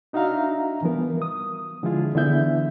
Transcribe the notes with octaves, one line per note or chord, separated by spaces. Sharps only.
D4 D#4 F#4 E5 F5 A#5
E3 F3 G3 B3 A#4
D#6
D3 F3 G#3 E4 F4 G#4
D3 E3 B3 E4 E5 G6